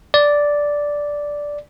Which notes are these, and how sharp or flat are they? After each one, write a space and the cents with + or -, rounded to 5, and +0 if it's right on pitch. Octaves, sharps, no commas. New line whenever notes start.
D5 -5